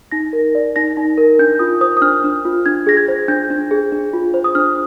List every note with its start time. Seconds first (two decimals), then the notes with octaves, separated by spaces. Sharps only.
0.12 D#4 A#6
0.33 A#4
0.55 D5
0.76 D#4 A#6
0.97 D#4
1.18 A#4
1.39 D4 G6
1.59 F4 D#6
1.81 C5 D#6
1.97 D#6
2.02 D4 F6
2.24 D4
2.45 F4
2.66 D4 G#6
2.87 G#4 A#6
2.97 G#6
3.08 C5
3.28 D4 G6
3.50 D4
3.71 G#4
3.92 D4
4.13 F4
4.34 C5
4.44 D#6
4.55 D4 F6